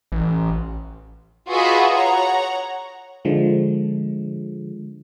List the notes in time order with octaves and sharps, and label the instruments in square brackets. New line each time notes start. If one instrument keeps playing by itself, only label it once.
[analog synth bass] A1
[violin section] F4 F#4 G#4 B4 D#5 E5
C#5 F#5 A#5
[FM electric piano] D3 F3 G#3